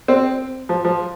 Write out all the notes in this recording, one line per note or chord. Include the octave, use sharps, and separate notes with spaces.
C4
F3
F3